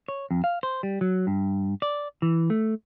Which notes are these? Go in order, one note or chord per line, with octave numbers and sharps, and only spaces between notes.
C#5
F2
F5
C5
G3
F#3
G2
D5
E3
A3